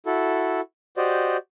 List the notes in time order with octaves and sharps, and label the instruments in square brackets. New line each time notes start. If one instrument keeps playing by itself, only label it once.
[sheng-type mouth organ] E4 F#4 A4
F#4 G4 C5 D5 D#5